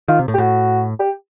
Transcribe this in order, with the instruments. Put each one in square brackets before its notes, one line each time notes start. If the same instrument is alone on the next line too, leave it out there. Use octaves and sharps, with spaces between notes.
[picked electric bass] D#3 [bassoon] F4
[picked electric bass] C3
A2
[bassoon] G4
[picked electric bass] A2 [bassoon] F#4
[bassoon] G4